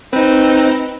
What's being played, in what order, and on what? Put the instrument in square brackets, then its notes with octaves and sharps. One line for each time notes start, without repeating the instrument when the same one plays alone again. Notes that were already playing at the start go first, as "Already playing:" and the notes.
[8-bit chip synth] C4 D#4 [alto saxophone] B4